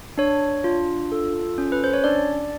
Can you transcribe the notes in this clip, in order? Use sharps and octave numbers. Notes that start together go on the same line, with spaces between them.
D4 C#5
F4
A4
C#4
B4
C5
C#5
D4 D5